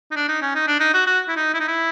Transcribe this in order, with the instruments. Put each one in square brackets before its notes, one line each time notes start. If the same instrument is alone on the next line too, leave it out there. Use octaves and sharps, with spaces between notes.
[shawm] D#4
D4
D#4
C#4
D#4
D4
D#4
F#4
F#4
E4
D#4
E4
D#4
E4